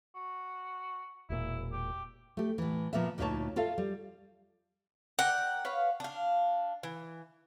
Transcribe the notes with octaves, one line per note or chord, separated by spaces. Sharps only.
F#4
E1 A#2 E4
G4
A3 G4
A2 E3
A#2 F3 A#3 B3 E5
D2 A#2 D#4 G4 C#5 A5
F4 A4 E5 F5
G3
A#4 D5 F#5 G5
B4 C#5 F5
D4 F5
E3